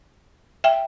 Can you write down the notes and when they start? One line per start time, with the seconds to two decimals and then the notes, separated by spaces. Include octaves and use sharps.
0.64 E5 G5